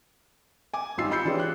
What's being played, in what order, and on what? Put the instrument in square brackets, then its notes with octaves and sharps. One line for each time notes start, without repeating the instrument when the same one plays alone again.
[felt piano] G#5 D6
G#1 G3 D#4 F4 E6 C7
B5 E6 G6 C7 C#7
E3 D4 F4 G4 G#4 C#5
F#6